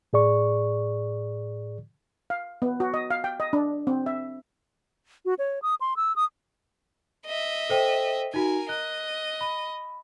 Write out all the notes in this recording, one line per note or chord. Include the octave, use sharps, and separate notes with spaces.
A2 G#4 D5 C#6
F5
B3
F#4
D#5
F5
G5
D#5
D4
C4
E5
F#4
C#5
D#6
C6
E6
D#6
D#5 E5
A4 C5 G5
D#4 F#4 A#4 G#5
D#5 F#6
B5